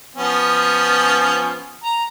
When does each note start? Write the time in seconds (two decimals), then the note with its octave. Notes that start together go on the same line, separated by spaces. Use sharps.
0.16 F3 B3 C#4
1.84 A#5